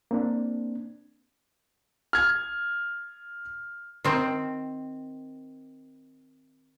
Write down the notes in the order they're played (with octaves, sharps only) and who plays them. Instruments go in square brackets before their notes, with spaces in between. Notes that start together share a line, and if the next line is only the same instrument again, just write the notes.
[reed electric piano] A#3 C4 D4
[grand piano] F6 G#6
[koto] D#3 C4